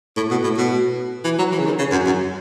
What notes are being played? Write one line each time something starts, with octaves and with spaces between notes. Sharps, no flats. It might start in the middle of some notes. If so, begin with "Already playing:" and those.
A2
B2
A2
B2
E3
F#3
E3
C#3
D#3
C#3
F#2
F#2